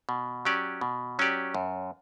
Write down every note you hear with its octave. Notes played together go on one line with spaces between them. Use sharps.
B2
F#3 C#4 G4 D5
B2
F#3 C#4 G4 D5
F#2